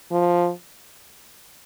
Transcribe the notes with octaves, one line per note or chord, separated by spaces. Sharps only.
F3